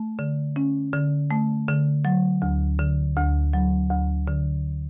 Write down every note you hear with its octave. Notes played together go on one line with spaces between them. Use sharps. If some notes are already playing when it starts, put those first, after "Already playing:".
Already playing: A3
D3
C#4
D3
A3
D3
F#3
D2
D3
D2
F#3
D2
D3